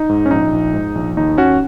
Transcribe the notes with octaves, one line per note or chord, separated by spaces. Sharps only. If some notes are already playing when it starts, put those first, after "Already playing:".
Already playing: D#4
G#2
C#4
A#1 D#4
A#1
G#2
A#1
D#2 D#4
D#2 C#4 F#4